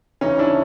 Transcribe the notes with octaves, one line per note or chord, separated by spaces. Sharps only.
D2 C#3 E3 C#4 D#4
D4 E4